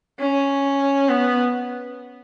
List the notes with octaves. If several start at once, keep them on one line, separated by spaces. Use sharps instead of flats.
C#4
B3